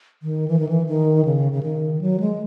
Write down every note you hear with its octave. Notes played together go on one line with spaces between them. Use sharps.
D#3
E3
D#3
E3
D#3
C#3
C#3
D#3
F#3
G#3